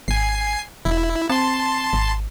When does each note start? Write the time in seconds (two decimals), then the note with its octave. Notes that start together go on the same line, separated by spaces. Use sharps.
0.08 G#1 G#5 C7
0.85 E1 E4
1.29 C4 A5 C6
1.93 G#1